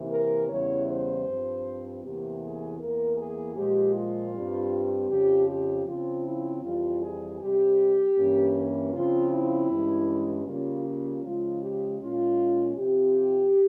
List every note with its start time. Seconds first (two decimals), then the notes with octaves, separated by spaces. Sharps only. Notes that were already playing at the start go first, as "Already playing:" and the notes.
Already playing: C3 E3 A#3
0.12 A#4
0.49 E2 C#3 E3 G3 C#5
0.89 C5
1.27 G2 F3 C4
2.03 E2 C3 E3 A#3 G4
2.42 G#4
2.79 E2 E3 A#3 A#4
3.17 G#4
3.56 A#2 F3 G#3 G4
3.94 F4
4.33 G2 G3 C4
5.09 F2 C#3 F3 G4
5.47 G4
5.86 C#3 F3 C4 F4
6.24 E4
6.62 F2 E3 G3 F4
7.02 G#4
7.40 C3 G3 C4 G4
8.16 G2 E3 A#3 C#4
8.93 C#3 F3 C4 F4
9.31 E4
9.70 G2 E3 G#3 C#4
10.46 C#3 G3 A#3 C#4 F4
10.85 F4
11.23 C#3 F3 G#3 F4
11.62 G4
12.00 A#2 G#3 C#4 F4
12.76 C3 F3 C4 G4